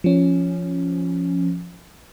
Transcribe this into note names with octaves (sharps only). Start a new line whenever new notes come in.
F3 C#4